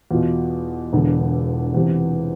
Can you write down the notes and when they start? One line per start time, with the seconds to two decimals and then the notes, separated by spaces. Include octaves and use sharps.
0.11 E2 B2 F4
0.93 E1 E2 D3
1.74 E2 C3 E3